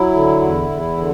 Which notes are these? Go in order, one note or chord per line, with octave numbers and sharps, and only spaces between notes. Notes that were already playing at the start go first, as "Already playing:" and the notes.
Already playing: F#3 E4
D3
E2
E2
D3